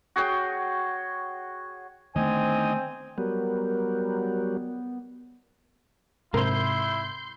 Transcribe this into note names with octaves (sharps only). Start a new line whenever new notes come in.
F#4 G#4 C#5 G5
D3 D#3 A3 B3 C4 D#4 D#5 G#5
F#3 G3 B3 A#4
G#2 C3 E4 A#4 C5 C6 G6